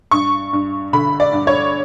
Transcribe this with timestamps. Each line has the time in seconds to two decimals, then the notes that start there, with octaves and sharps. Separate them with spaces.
0.11 G2 C#6
0.53 G2
0.93 D3 B5
1.20 D5
1.33 G2
1.47 C#5